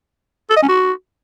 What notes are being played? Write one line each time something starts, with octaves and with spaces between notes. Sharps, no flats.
A4
D#5
C#4
F#4